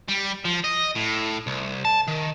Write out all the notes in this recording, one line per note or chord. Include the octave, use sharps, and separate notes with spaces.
G3
F3
D#5
A2
C2
A5
D#3